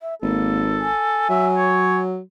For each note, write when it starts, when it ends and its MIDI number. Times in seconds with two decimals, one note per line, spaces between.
0.01 0.14 76
0.22 0.91 32
0.22 0.61 58
0.22 1.25 69
0.80 1.99 80
1.30 2.19 54
1.30 1.47 76
1.57 2.01 73